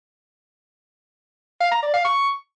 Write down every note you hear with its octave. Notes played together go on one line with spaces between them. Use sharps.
F5
A#5
D5
F5
C#6